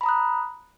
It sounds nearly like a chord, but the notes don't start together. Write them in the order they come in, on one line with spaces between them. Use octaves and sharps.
B5 A#5 D#6 F#6